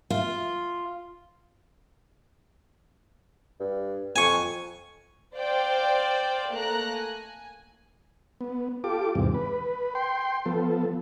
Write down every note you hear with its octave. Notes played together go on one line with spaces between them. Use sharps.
F4
G2
F2 G#5 C#6
C5 D5 F5 G5
A3 A#3 A#5 F#6 A#6
G#5
B3
F4 G4 A4 D6
E2 G#2 C3
B4
G5 C6
F3 B3 A4